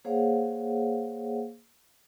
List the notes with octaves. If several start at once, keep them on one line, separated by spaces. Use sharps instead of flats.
A#3 G#4 C5 C#5 F5 F#5